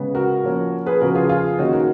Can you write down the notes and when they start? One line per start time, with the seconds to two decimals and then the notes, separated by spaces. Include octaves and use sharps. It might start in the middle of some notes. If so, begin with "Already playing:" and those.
Already playing: C#3 G#3 B3
0.15 F#4 A#4
0.44 F3 A#3 C#4
0.86 G#4 B4
1.01 C#3 F3 B3 F#4 A#4
1.15 F4 G#4
1.29 F4 G#4
1.58 D#3 A#3 C#4 D#4 F#4
1.73 F#4 A#4